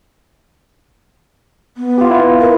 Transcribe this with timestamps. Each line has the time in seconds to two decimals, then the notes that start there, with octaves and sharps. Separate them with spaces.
1.77 B3
1.98 F4 G4
2.09 E4 F4 B4
2.41 A#4